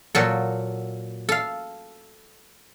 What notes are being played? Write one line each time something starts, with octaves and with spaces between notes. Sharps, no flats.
A#2 F#3 A4
A4 F5